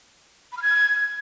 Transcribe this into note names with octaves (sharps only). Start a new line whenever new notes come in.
B5
F6
G#6